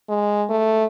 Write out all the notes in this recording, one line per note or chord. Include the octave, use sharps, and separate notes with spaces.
G#3
A3